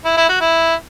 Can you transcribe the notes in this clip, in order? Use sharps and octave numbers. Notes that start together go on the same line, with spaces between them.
E4
E4
F#4
E4